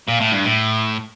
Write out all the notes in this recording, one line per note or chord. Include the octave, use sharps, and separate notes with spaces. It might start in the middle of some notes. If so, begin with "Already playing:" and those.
A#2
A2
G2
A2